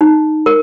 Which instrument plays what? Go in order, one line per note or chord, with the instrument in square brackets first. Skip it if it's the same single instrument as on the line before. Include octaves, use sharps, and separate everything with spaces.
[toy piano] D#4
A#4